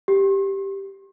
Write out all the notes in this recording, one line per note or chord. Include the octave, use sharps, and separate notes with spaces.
G4